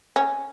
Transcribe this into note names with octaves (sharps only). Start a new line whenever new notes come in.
C#4